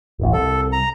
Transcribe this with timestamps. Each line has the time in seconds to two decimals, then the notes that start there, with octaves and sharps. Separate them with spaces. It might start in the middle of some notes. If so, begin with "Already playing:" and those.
0.19 D1 A1
0.33 C2 A4
0.72 A#5